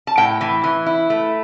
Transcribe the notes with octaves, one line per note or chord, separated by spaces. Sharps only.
A5
A2 G5
E3
E3
E4
A3